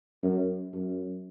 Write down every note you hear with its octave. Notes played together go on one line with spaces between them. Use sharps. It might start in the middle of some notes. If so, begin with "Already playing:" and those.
F#2
F#2